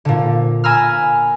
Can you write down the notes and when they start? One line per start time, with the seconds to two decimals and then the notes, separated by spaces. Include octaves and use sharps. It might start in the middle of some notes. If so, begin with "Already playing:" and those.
0.05 A#2 D3
0.64 G#5 A#5 B5 E6 F6